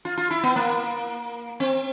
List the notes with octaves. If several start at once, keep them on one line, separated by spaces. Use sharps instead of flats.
F4
F4
E4
B3
A#3
C4